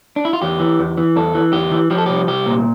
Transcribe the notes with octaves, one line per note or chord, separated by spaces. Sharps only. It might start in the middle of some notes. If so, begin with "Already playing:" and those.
D4
E4
F4
E2 G4
E3
E2
E3
E2 A4
E3
E2 G4
E3
F3 G4
A4
C2 G4
C2 G4
A#2